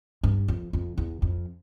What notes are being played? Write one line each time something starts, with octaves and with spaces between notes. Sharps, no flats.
G2
F2
F2
E2
F2